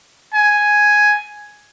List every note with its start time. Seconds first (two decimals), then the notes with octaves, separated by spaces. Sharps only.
0.34 G#5